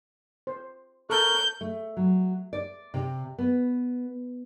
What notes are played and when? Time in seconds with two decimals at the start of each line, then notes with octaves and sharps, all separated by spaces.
0.47 C5
1.10 A4 A#4 C#6 F#6 G6
1.61 A3
1.97 F#3
2.53 D5
2.94 C3
3.38 B3